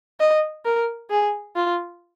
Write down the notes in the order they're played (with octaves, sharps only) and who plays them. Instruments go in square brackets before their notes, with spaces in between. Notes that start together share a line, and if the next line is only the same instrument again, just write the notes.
[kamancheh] D#5
A#4
G#4
F4